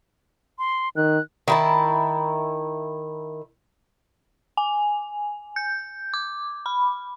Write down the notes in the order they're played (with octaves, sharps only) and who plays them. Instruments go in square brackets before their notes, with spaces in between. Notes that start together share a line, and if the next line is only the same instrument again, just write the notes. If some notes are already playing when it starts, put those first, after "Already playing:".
[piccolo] C6
[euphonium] D#3 [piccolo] F#6
[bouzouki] D#3 E4 A5
[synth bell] G#5
G6
D6
B5